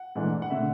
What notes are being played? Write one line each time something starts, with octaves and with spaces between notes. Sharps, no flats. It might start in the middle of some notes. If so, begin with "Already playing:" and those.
Already playing: F#5
G#2 E3 A3 D4
F#5
D3 A3 E5